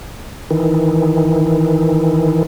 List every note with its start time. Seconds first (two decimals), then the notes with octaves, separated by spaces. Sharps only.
0.51 D#3 E3